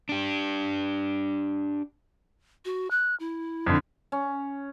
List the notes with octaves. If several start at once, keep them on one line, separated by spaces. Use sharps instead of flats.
D4 G4
F#4
F#6
E4
F2 D3
C#4